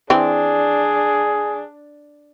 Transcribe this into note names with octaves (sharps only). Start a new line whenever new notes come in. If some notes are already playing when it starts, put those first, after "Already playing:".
E3 C4 D4 G#4